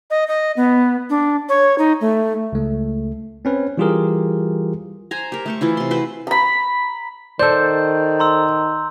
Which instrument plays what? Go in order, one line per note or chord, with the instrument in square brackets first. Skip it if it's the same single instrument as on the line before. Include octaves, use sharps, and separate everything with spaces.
[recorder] D#5
D#5
B3
D4
C#5
D#4
A3
[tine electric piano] C#2 A3
C4 C#4 B4
E3 G3 F4 G4 G#4 A#4
[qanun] C5 G#5 A#5
G4 A#4
A3 C5 C#6
E3 E4 F4
C3 C6
F#4 B4 C5 G5
[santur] A#5 B5
[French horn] D#3 [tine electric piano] A4 C5 [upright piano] D5 [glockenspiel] G6
[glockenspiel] A#5 C6 E6